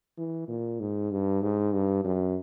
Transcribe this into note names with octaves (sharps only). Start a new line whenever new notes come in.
E3
A#2
G#2
G2
G#2
G2
F#2